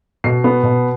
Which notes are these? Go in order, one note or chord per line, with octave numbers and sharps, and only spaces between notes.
B2 C7
B3
B2